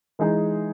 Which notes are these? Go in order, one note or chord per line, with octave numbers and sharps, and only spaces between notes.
E3 G#3 D#4 G#4